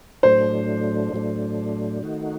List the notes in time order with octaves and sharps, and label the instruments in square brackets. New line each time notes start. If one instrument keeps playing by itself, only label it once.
[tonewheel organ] A2 F#3 A3 D4 [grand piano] C5
[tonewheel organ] A2 F#3 A3 D4
D#3 A3 D#4 F#4